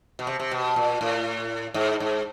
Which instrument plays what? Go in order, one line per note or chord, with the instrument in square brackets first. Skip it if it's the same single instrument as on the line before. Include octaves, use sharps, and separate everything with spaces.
[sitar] B2
C3
C3
B2
A#2
A2
G#2
G#2